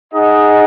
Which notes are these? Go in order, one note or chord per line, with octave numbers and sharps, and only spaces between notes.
D#4 G#4 D#5 F#5